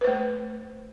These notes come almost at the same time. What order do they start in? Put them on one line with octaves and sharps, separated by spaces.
B4 C5 A3